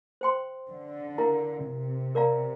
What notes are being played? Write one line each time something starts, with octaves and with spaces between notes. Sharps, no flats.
C5 G5 C6
D3
E4 A#4 F5 A#5
C3
A#4 D5 F5 A#5